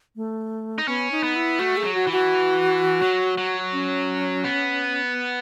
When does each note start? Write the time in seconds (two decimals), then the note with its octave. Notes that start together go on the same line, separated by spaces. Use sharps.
0.16 A3
0.78 D#4
0.87 B3 C#4
1.12 D#4
1.23 B3
1.36 E4
1.59 A3 F#4
1.77 G#4
1.83 F#3
1.95 F#4
2.07 E3
2.12 F#4
3.02 F#3
3.38 F#3
3.72 C#4
4.44 B3